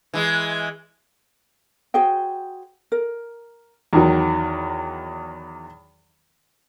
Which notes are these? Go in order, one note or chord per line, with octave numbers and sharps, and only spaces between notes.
E3 G#3
F#4 G#4 C5 G5
A#4
E2 D#3 F#3